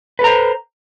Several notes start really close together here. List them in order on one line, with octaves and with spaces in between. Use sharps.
B4 A4 A#5 C5